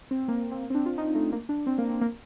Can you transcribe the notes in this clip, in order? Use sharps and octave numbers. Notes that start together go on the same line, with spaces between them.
C4
A#3
C4
A#3
C4
D4
F4
D#4
A3
A#3
D4
C4
A#3
A#3
A#3